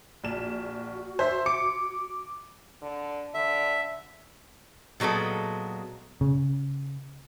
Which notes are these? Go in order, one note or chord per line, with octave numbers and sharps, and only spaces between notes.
A#1 F#4 E7
C5 E5 C6
D6 C#7
D3
D3 E5
A#2 F#3 G#3 B3 A4
C#3